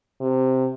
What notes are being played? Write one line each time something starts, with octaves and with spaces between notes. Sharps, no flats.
C3